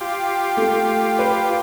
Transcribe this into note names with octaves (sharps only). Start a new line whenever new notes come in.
F4 G4
A3
B4